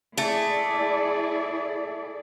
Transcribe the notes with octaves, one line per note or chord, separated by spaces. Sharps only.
A3 E4 G#4 D5